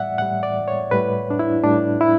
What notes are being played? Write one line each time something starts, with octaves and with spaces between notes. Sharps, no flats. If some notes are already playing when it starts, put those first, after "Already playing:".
Already playing: A2 G3 D5 E5 F#5
A2 G3 F#5
D5
C#5
A2 G3 B4
D4
E4
A2 G3 D4
E4